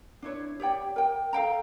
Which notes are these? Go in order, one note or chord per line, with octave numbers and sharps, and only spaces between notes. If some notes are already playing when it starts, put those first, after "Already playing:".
D4 E4 C#5
G4 C#5 D5 G5
A#4 G5
A4 F5 G5 A#5